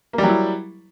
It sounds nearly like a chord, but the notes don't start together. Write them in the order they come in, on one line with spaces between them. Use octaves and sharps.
A#3 G3 F#3 E4